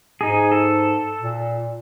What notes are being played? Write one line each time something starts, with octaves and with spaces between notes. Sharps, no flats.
G#2 D#4 G#4
A4
A#2